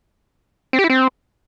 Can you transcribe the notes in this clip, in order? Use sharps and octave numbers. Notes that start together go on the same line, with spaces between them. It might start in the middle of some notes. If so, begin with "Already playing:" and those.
C4
G4
E4
C4